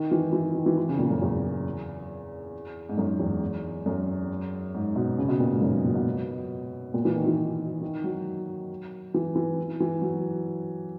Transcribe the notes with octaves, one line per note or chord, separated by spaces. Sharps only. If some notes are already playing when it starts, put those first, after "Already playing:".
Already playing: D#3
E3
E3
D#3
E3
E3
C#3
A#2
F#2
E2
G#2
F#2
E2
F#2
G#2
B2
C#3
B2
A#2
G#2
F#2
A#2
B2
A#2
E3
D#3
E3
D#3
F#3
E3
E3
E3
F#3